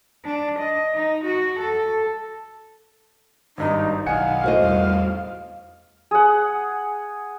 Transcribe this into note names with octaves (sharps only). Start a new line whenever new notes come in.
D4
D#5
D#4
F#4
A4
G#1 G2 D#4
B1 D#3 F5 F#5 G#5 C#7
A2 F#4 C5 D#5
E2 G3 F5
G#4 F#5